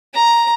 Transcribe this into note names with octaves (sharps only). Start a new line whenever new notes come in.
A#5